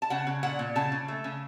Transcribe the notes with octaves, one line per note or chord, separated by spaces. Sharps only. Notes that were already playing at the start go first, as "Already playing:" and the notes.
A5
C#3 F#5
C#3
A#2 F#5
A#2
C#3 A5
C#3
A3
C#3